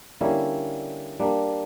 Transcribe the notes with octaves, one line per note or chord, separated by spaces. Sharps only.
D3 G3 A#3 C#4 E4
G3 A#3 D4